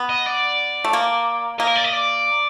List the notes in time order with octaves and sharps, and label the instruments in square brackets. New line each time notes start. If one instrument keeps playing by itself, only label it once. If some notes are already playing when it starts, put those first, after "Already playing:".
Already playing: [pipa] B3
[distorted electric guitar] D#5
D5
[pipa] A3
A#3
[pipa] A#3 [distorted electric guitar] D#5
[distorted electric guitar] A#4
D5
D#5
D5